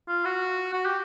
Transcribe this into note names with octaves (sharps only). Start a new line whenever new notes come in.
F4
F#4
F#4
G4